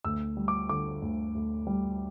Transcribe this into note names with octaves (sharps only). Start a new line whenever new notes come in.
D2 E6
G3
D6
D3 D6
D2
D2
G3